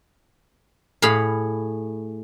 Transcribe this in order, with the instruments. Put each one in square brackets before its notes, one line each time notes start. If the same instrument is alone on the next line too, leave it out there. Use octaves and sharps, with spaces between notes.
[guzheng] A2 G#4 F5 B5